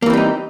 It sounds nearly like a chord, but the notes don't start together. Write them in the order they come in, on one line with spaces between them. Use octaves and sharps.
A#3 E3 C4 G3 D#4